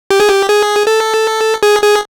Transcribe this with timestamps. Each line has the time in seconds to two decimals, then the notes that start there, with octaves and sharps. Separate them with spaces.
0.10 G4
0.20 G#4
0.29 G4
0.49 G#4
0.87 A4
1.63 G#4
1.82 G#4